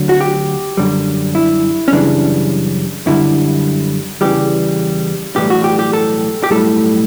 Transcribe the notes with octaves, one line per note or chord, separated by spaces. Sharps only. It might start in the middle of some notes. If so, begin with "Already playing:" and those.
Already playing: D2 D3 F#3
F#4
G4
F#2 D3 G3
E4
C#4
F#2 C#3 E3 G3 D4
F#2 D3 G3 E4
E2 C#3 E3 G3 G4
B1 A2 E3 G3 G4
F#4
G4
G4
A4
G4
B1 A2 G3 A4